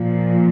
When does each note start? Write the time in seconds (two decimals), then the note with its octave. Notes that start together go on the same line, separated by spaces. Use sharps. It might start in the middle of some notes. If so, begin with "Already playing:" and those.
Already playing: A#2 F3